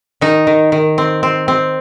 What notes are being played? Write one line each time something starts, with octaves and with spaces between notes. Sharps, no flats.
D#3 D#4
D#3
D#3
C4
C4
C4